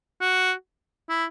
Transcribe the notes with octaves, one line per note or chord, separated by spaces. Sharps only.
F#4
E4